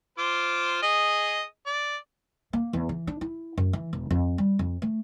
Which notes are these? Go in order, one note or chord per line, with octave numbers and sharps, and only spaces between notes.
F4 C5 D6
G#4 D#5
D5
A#3
E2
E3
D4
E4
F#2
E3
E1
F2
G3
F2
A3